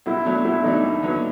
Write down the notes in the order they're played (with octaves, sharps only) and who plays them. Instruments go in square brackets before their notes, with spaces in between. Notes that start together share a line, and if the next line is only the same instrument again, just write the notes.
[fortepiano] B1 [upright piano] E4
[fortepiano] B2 F#3 A3 D4
[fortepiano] B1 [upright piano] E4
[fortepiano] B2 F#3 A3 D4 [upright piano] D#4
[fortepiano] D#2
D3 F#3 B3